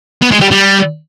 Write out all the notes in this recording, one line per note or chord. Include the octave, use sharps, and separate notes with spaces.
B3
G#3
G3
G3